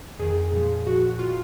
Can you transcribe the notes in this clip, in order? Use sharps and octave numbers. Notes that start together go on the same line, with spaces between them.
F2 D#3 G#4
A#2 F3
A#2 F3 F#4
D#3 F4